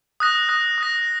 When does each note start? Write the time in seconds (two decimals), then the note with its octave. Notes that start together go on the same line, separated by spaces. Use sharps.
0.20 D#6 F#6 A#6
0.49 D#6 F#6 A#6
0.78 D#6 F#6 A#6